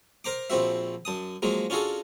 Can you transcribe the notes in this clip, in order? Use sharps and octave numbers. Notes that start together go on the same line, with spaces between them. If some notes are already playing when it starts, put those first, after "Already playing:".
A#4 C5 A#5 D6
A#1 F3 C4 F#4 E5
F#2 A5 D#6
F3 F#3 G#3 A#3
C#4 D4 F4 F#4 G#4 A4